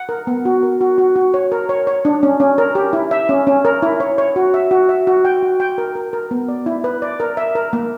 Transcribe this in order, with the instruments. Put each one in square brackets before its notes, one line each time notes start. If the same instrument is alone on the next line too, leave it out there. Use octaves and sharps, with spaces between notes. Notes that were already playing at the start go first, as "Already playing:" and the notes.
Already playing: [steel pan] F#5
A#4
B3
F#4
A#4
F#4
F#4
F#4
C#5
A#4
C#5
C#5
D4
C#4
C#4
A#4
G4
E4
E5
C#4
C#4
A#4
E4
C#5
C#5
F#4
E5
F#4
E5
F#4
G5
F#4
G5
A#4
A#4
A#4
B3
D5
E4
B4
D5
A#4
E5
A#4
A#3